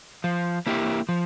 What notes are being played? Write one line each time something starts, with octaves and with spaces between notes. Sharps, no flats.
F3
A#3 E4 G4
F3